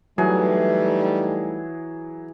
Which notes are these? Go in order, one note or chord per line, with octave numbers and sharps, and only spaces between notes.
E3 F#3 G3 A3 D#4 G#4